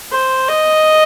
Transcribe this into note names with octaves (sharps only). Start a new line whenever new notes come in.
C5
D#5